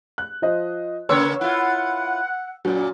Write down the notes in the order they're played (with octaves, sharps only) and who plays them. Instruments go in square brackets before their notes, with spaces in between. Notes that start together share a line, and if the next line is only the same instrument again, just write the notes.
[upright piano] F#6
F3 C5 D#5
[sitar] C#3 A#3 C#5 [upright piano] B4 C6 E6
[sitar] E4 F4 [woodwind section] F#5
[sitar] F#2 A#2 [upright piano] F#3